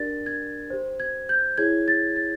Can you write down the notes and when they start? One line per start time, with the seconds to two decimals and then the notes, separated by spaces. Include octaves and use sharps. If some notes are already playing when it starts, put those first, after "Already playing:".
Already playing: D4 G4 A#4 D5 A6
0.26 G#6
0.70 G4 C5
1.00 G#6
1.29 G6
1.58 E4 G#4 C#5 G#6
1.88 A6
2.16 A6